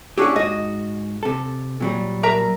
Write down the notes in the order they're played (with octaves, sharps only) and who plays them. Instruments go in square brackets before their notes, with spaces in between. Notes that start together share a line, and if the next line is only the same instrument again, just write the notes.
[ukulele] C#4 D4 E4 [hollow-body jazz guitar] G4 G#4 F#5
[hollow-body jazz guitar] G#2 F#4 [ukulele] D#5
[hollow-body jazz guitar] C3 A4
A#2 F#3 G3
[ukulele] A#4 E5 A#5